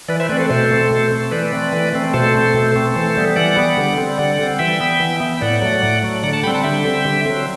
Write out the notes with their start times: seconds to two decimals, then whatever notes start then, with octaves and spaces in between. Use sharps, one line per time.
0.09 E3 B4 D5
0.20 C5 E5
0.29 A3 C4 B4 D5
0.39 A4 C5
0.49 B2 A4 C5
0.71 A3 C4
0.91 B2
1.12 A3 C4
1.31 E3 B4 D5
1.53 A3 C4
1.72 E3
1.94 A3 C4
2.14 B2 A4 C5
2.35 A3 C4
2.54 B2
2.75 A3 C4
2.96 E3 A4 C5
3.17 G3 B3
3.36 E3 D5 F#5
3.57 G3 B3
3.77 D3
3.98 G3 C4
4.18 D3 D5 F#5
4.39 G3 C4
4.59 E3 E5 G5
4.80 B3
5.00 E3
5.20 B3
5.37 G5
5.41 A2 D5 F#5
5.61 F#3 A3
5.83 A2
6.03 F#3 A3
6.23 D3 D5 F#5
6.33 F#5 A5
6.43 G3 G5 B5
6.47 C4
6.55 F#5 A5
6.64 D3 E5 G5
6.85 G3 C4
7.05 D3
7.25 F#3 C4